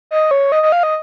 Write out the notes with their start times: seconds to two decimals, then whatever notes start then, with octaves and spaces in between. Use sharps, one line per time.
0.11 D#5
0.31 C#5
0.52 D#5
0.63 D#5
0.72 F5
0.83 D#5